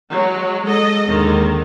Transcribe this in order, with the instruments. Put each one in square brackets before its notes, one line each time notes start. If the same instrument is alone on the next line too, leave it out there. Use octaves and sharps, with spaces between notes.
[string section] F#3 G#3
[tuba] G#3 [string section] A4 D#5
[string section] D#2 D3 D#3